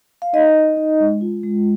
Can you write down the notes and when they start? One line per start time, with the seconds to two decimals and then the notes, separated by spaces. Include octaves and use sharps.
0.22 F5
0.33 D#4 D#5
0.55 D#4
0.77 D#4
1.00 G#3
1.21 F4
1.44 G#3